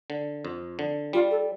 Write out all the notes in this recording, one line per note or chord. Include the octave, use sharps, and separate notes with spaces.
D3
F2
D3
G3 F4
A4